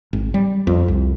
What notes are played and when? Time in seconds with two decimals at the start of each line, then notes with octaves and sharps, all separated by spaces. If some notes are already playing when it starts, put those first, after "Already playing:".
0.13 G#1
0.34 G3
0.67 F2
0.88 C2